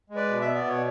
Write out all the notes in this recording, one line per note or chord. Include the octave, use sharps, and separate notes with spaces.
G#3
B4 D5
B2
E5
B3
D5
B2 C#5